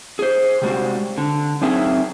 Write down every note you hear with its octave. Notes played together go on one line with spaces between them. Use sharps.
G#4 C5
C3 G3 G#3 F#4
D3
F#3 C4 D#4 G#4 A#4 E5